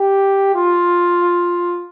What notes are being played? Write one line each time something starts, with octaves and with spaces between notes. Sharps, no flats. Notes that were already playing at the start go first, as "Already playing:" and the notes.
Already playing: G4
F4